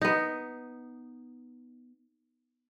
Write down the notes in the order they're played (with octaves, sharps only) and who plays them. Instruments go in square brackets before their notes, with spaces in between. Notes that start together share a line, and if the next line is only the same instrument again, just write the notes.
[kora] B3 D#4